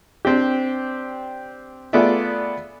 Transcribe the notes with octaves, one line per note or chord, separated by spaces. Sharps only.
C4 D4 G4
A3 B3 F4 G#4 D5 E5